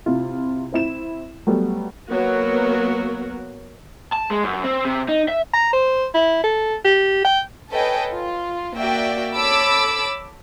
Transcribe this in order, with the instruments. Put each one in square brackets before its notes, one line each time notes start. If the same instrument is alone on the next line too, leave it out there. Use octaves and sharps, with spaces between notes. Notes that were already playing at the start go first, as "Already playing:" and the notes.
[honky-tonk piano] C3 E4 F4
C4 E4 E7
F#3 G3 A3 B3
[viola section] F#3 A#3 B3 F#4 A#4
[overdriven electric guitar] A5
G#3
F#2
C4
C3
D#4
E5
[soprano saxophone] A#5
C5
E4
A4
G4
G5
[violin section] A4 B4 C#5 D#5 G5 G#5
F4
A#3 F#4 D5 E5 G5
A4 C#5 B5 D6 E6